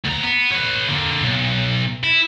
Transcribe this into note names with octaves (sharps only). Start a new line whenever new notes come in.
D2 A#5
B3
B4 C#5
D3 A#3
B1
E4